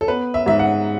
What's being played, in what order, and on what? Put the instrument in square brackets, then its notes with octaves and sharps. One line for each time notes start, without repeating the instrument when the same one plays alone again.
[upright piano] A4
B3 B4
E5
G#2 E5
F#5